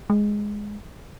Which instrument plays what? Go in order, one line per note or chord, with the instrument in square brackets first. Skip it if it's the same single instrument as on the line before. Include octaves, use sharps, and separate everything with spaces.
[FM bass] G#3